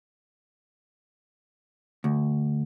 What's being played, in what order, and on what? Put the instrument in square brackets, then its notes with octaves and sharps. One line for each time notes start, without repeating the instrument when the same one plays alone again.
[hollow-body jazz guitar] D2